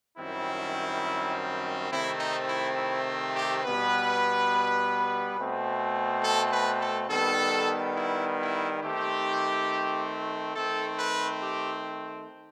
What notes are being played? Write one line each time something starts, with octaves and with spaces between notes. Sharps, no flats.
F#2 D#3 G3 C4 E4
C3 D#3 A3 C4 E4
D#4
E4
E4
G4
B2 G3 B3 B4
B2 A3 C4
A4
B4
A4
D#3 G3 B3 A4
E4
E4
D#3 A3 C4 G4
D#3 A3 C4 A4
B4
G4